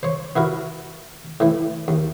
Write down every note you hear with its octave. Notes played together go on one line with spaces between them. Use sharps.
C5 C#5
B3 E4 F#4 A#4
A2 E3
D#2